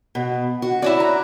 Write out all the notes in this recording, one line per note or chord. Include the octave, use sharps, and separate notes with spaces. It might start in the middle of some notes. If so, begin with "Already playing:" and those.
B2
F#4
C#4 E4 F#4 D5
A#5